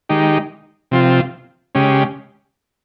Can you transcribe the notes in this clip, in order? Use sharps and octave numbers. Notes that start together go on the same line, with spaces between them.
D#3 G#3 D#4 G4
C3 F3 C4 F4
C#3 G#3 C#4 G4